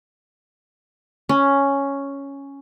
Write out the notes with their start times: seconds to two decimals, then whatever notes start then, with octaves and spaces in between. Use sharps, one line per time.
1.29 C#4